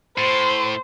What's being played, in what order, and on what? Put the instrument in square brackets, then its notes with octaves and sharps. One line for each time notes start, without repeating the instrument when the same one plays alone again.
[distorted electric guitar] A2 [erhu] C5